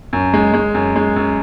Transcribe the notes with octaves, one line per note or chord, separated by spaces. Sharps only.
F#2
G#3
G#3
F#2
G#3
F#2